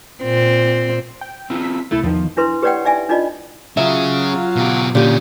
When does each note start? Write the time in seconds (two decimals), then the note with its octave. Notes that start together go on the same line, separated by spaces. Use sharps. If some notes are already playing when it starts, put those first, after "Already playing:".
0.23 A#2 C4
1.21 G5
1.50 C4 E4 F4
1.62 B6
1.91 C2 A3 E4 A6
2.03 E2 D#3 F3
2.37 D4 E4 B4 C6
2.62 G4 B4 C#5 D5 F#5 G5
2.85 D#4 D5 E5 G#5
3.09 D4 D#4 F4 D5 D#5
3.77 F#3 C#4 F4 G#4 E5
4.56 B2 G4
4.95 A#2 D3 C#4 G4